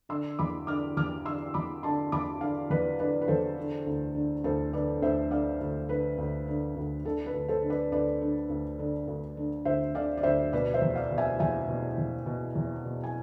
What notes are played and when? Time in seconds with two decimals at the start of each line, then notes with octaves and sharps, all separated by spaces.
0.09 D3 C6 E6
0.39 E2 B5 D6
0.67 D3 D6 F6
0.97 E2 D6 F6
1.25 D3 C6 E6
1.54 E2 B5 D6
1.83 D3 A5 C6
2.12 E2 B5 D6
2.41 D3 D5 F5
2.70 E2 B4 D5
3.00 D3 B4 D5
3.21 B4
3.28 E2 A4 C5
3.58 D3
3.86 D2
4.15 D3
4.44 D2 A4 C5
4.73 D3 B4 D5
5.02 D2 C5 E5
5.31 D3 D5 F5
5.61 D2
5.89 D3 B4
6.18 D2
6.48 D3
6.76 D2
7.04 D3 A4
7.26 B4
7.34 D2
7.48 A4 C5
7.63 D3
7.70 B4 D5
7.92 D2 B4 D5
8.22 D3
8.49 D2
8.79 D3
9.08 D2
9.37 D3
9.65 D2 C5 E5
9.95 D3 D5 F5
10.17 D5
10.23 D2 C5 E5
10.52 B2 B4 D5
10.74 C5 E5
10.82 E2
10.96 D5 F5
11.11 B2
11.18 E5 G#5
11.39 E2 E5 G#5
11.68 B2
11.98 E2
12.26 B2
12.55 E2
12.85 B2
13.04 G#5